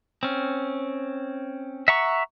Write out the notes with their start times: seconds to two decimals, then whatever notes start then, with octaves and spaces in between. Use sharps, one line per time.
0.23 C4 C#4
1.88 E5 F#5 A#5 C#6